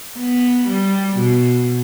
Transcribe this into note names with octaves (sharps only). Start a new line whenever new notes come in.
B3
G3
B2